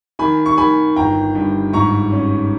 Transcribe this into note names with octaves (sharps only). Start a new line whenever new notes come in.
D#3 G#5 B5
C#6
D#3 G#5 B5
G1 G5 A#5
G2
G#2 A#5 C#6
C#4